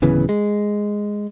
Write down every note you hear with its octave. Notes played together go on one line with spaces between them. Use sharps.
D1 C#3 E3 B3
G#3